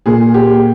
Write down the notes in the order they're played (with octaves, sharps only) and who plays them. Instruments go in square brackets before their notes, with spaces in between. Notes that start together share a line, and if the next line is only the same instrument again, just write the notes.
[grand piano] A#2 G#4
G4